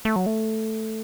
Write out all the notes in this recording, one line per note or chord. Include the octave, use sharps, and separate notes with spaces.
A3
F#3
A3